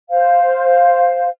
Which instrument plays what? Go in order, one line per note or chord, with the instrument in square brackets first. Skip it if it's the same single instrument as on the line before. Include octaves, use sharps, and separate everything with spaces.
[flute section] C5 F5